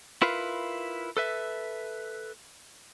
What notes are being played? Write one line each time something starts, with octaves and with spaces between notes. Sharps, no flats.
E4 F4 A#4 B4 F5
A4 B4 E5